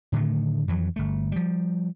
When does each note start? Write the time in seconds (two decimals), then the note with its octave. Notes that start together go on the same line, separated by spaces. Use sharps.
0.12 A2 D3 D#3 A3
0.68 F2 E3 F#3
0.96 G1 A3
1.32 F3 G3